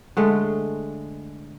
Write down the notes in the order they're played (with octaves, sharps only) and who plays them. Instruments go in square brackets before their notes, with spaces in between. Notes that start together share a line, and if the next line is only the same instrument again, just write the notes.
[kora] D3 G#3 A3